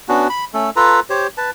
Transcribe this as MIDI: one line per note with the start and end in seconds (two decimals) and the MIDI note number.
0.09 0.28 59
0.09 0.28 61
0.09 0.28 62
0.09 0.28 66
0.29 0.45 83
0.54 0.70 57
0.54 0.70 61
0.54 0.70 69
0.76 1.00 65
0.76 1.00 69
0.76 1.00 71
0.76 1.00 82
1.10 1.27 67
1.10 1.27 72
1.10 1.27 73
1.37 1.50 71
1.37 1.50 81